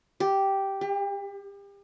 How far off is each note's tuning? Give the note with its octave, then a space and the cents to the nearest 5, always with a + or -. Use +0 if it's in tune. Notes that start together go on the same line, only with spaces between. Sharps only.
G4 -5
G4 +35